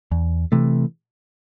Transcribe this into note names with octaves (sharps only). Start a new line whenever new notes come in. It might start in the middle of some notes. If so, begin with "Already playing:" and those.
E2
C3 E3 A3